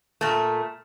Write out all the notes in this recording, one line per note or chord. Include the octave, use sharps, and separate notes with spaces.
A#2 A3